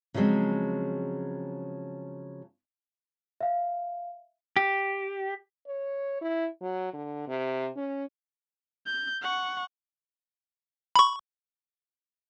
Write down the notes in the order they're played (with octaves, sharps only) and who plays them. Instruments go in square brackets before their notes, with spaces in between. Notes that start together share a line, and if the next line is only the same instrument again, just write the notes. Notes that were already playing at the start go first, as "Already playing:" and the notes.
[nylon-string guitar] C#3 F3 F#3 G#3 C4
[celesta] E5 F5
[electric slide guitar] G4
[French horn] C#5
E4
F#3
D3
C3
C#4
[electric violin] G6
F#5 C#6
[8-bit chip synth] B5 C#6